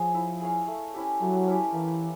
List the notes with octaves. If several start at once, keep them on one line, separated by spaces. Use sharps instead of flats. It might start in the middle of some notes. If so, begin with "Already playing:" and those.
Already playing: F3 G#4 C#5
E4
G#4 C#5 F5
A3
C#4 E4 G4
F#3 A3
C#4 E4 G4
E3 A#3